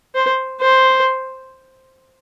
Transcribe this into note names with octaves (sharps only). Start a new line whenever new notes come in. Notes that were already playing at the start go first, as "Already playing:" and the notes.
C5
C5